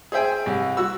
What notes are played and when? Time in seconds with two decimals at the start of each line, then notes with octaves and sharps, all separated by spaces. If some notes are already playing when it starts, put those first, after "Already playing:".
0.12 G#4 C5 E5 G5 G#5
0.46 C2
0.77 F#4 E6